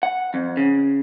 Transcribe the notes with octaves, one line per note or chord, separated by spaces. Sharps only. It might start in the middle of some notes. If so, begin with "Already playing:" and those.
F#5
F2
C#3